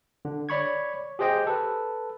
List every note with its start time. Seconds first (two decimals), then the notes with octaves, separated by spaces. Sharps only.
0.25 D3
0.49 C#5 D5 B5 C#6 G#6
1.19 G4 G#4 C5 D#5 G5
1.47 A4 B4